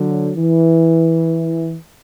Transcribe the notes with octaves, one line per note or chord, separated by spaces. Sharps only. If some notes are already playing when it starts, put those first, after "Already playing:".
Already playing: D3 F#3
E3